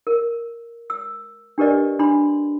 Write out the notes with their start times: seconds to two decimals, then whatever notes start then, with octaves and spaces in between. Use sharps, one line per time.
0.07 A#4
0.90 E6
1.58 D4 G4 A#4 B4 D5 D#5
1.99 D4 B5 C6